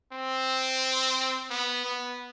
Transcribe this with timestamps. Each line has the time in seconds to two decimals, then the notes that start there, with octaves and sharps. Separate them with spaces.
0.13 C4
1.50 B3
1.85 B3